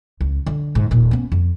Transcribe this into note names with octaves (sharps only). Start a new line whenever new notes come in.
C#2
D3
G#2
D#1 A#2
B3 C#4
F2